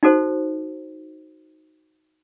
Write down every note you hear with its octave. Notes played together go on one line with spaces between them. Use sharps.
D#4 F#4 A4 C5